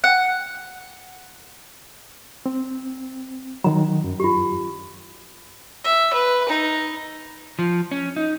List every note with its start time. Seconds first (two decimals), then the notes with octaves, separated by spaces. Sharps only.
0.04 F#5
2.46 C4
3.64 D#3 F#3 A#5
4.04 F#2
4.20 F4 G4
5.84 E5
6.14 B4
6.49 D#4
7.59 F3
7.91 C#4
8.16 D#4